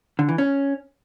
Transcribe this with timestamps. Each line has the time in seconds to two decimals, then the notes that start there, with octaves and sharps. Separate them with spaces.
0.19 D3
0.29 E3
0.38 C#4